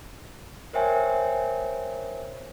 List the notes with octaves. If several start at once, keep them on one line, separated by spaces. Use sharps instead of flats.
A#4 C5 C#5 E5 G5 G#5